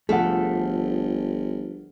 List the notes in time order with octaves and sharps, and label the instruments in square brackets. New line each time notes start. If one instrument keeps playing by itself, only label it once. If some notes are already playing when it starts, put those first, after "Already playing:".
[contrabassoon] G1 [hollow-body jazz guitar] F3 A3 [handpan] G#4 F#5 [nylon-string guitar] A4